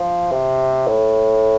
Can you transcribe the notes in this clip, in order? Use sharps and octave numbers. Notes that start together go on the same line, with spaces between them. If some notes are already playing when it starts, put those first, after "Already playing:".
Already playing: F3
C3
A2